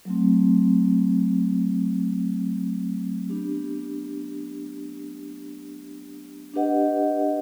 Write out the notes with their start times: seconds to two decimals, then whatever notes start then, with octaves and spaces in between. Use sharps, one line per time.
0.05 F#3 A3 C4
3.29 B3 D4 G4
6.54 D4 G4 B4 D#5 F#5